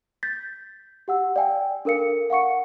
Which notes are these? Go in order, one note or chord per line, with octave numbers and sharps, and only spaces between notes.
G6 A6 B6
G4 F#5 E6
D5 F5 G5 G#5
D4 A4 A#4 F5 C#7
F5 F#5 C#6 C#7